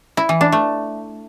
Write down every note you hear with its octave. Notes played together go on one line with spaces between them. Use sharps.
E4
E3
D4
A3